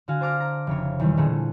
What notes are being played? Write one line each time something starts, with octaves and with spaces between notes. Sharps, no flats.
D3 F#4 F5 G#5
C5 A5 D6 F6 A#6
A#5
F1 C#3 C#5
E2 B2 D#3 F#3 G3
A#2 D3 A3 G#4